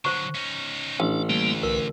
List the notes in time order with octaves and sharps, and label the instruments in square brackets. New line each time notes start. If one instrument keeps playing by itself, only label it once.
[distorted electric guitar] D3 F#3 [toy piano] C5 C#6
[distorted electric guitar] C#4 D#4
[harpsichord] A1 [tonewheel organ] D4
[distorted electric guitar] D2 [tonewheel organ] G3 A#3 E4
[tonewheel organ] C2 B4 [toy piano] A#4